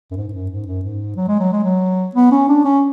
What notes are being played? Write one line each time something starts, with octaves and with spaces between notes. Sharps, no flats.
F#2
G#2
G#2
F#2
G#2
F#2
G#2
F#3
G#3
F#3
G#3
F#3
B3
C#4
D4
C#4